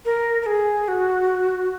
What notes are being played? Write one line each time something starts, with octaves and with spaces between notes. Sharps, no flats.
A#4
A#4
G#4
F#4